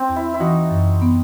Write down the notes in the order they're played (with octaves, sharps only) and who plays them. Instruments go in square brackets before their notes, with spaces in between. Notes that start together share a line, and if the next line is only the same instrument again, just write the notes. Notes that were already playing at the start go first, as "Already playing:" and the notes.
Already playing: [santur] C4
[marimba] E2
[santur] E4
E4
[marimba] E3 [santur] D#4 F#4
[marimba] F#2
B3